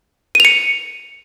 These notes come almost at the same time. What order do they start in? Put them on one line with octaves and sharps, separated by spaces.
D#7 F7 C#7